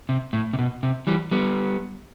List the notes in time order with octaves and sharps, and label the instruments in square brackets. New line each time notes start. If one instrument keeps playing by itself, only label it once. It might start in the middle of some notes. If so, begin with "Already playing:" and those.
[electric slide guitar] C3
A2
C3
B2
C3
E3 G3
G3 B3